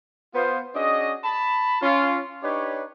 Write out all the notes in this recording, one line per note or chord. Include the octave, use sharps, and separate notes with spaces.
B3 F4 C5
C#4 D4 F#4 G#4 D#5
A5 B5
C#4 F4
D4 D#4 G4 B4 C#5